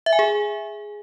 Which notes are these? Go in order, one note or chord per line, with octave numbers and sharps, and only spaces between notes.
E5
G#5
G#4